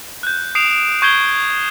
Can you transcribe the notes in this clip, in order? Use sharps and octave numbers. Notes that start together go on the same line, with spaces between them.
F#6 G6
D#6 C7 D7 E7 F7
C#6 G6 G#6 C7 G7